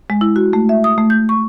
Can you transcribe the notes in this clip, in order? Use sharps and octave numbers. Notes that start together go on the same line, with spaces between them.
G#3
E4
F#4
A3
E5
D#6
A3
G6
C#6